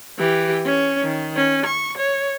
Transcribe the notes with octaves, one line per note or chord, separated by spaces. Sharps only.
E3 G4
C#4
D#3
C#4
C#6
C#5